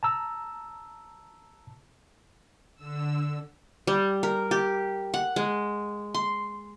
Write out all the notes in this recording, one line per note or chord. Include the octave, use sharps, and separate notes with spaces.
A5 A#5 E6
D3 E6
G3
A#4
G4
F#5
G#3
C6